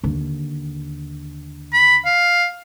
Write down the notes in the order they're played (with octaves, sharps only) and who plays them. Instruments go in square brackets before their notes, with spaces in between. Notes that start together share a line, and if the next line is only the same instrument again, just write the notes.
[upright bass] D#2 D3
[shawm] B5
F5